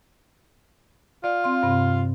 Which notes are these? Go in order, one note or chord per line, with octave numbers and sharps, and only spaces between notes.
F4 D5
C4 F5 C6
G2 C3 C4